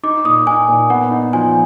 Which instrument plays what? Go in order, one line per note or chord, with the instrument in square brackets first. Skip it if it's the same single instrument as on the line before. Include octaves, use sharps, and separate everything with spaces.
[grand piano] D#4 [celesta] D6
[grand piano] A#2 [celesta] D#6
[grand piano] D#4 [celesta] G#5
[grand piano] A#2
[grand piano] B3 [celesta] F#5
[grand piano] D#4
[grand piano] F3 [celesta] G#5